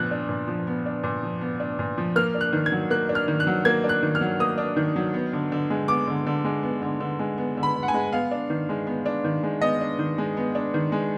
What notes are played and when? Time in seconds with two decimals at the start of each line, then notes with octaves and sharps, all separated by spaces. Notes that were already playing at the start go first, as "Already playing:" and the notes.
Already playing: A#2 F3 B3 D4 F#6
0.11 D4
0.29 A#2
0.47 F3
0.67 B3
0.86 D4
1.04 A#2
1.23 F3
1.41 B3
1.60 D4
1.79 A#2
1.98 F3
2.16 A#3 F6
2.35 D4
2.41 F#6
2.53 D#3
2.66 G#6
2.72 F#3
2.90 A#3 F#6
3.09 D4
3.15 F6
3.28 D#3
3.40 F#6
3.47 F#3
3.65 A#3 G#6
3.84 D4
3.89 F#6
4.03 D#3
4.15 F6
4.21 F#3
4.40 A#3 D#6
4.58 D4
4.77 D#3
4.96 F#3
5.14 B3
5.33 D3
5.52 D3
5.70 G#3
5.88 B3 D6
6.07 D3
6.26 D3
6.44 G#3
6.63 B3
6.82 D3
7.00 D3
7.19 G#3
7.38 B3
7.57 D3
7.63 B5
7.75 D3
7.83 F#5
7.88 G#5
7.94 G#3
8.12 B3 F5
8.31 D4
8.50 D#3
8.69 G#3
8.87 B3
9.06 D4
9.24 D#3
9.43 G#3
9.61 B3 D#5
9.81 D4
9.99 D#3
10.18 G#3
10.37 B3
10.55 D4
10.74 D#3
10.92 G#3